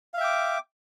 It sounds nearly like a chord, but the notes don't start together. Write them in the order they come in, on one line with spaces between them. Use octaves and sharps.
F5 E5 G5 D6